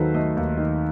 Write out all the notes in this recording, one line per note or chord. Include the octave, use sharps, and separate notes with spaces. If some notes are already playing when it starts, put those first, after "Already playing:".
Already playing: D#2 D#3 F#3 A4 B4 C5
A3 D#5
D#2
D#3